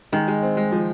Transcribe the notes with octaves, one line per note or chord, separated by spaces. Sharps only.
D#3 G#3
G#3
C4
G#3
F3